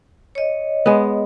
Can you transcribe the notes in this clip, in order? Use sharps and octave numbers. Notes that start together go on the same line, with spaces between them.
C#5 D#5
G#3 B3